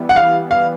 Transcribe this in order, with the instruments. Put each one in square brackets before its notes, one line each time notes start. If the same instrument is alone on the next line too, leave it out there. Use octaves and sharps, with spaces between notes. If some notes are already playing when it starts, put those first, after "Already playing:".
Already playing: [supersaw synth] E3 G3 B3
[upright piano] F#5
F5
F5